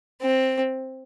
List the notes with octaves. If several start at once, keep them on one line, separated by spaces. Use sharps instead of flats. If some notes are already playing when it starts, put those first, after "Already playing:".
C4